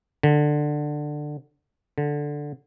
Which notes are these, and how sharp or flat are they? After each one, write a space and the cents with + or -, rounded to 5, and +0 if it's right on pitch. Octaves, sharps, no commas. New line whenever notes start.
D3 +15
D3 +0